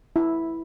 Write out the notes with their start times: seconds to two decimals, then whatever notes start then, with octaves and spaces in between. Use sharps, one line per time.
0.16 E4